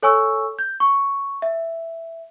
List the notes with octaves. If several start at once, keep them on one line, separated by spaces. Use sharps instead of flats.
A4 C#5 G#5 C#6 E6
G6
C#6
E5